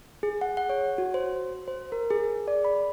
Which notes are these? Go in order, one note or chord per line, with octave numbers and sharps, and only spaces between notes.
G#4
F#5
F#5
C#5
F#4
C5
C5
A#4
G#4
D5
B5